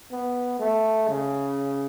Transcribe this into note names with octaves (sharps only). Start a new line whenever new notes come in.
B3
A3
C#3